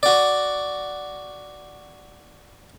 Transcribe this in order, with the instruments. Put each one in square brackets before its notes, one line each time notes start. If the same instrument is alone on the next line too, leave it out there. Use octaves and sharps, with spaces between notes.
[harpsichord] F#4 D5